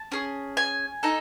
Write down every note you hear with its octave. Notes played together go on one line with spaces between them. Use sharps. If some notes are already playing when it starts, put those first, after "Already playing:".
Already playing: A5
C#4 G#4
G#5
D#4 A4